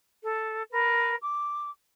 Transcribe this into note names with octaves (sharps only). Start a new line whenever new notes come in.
A4
A#4 B4
D6